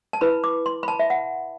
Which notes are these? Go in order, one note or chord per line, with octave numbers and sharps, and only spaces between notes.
A5
E4 B4 B5
D6
C6
B5
A5
E5
F#5